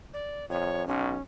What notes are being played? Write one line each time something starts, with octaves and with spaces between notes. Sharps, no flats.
D5
F2 C#5
B1 C#4